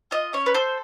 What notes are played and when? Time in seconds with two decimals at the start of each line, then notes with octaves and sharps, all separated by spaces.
0.11 F4 D#5
0.33 C#4 C#5
0.46 B4
0.55 A4 C5